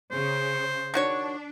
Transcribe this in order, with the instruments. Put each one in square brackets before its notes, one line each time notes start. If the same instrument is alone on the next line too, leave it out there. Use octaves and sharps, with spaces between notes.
[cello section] C#3 [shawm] C5
[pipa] D#3 F#4 C#5 [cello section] D4